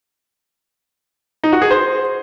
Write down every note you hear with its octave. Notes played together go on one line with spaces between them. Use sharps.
D#4
F#4
G#4
C5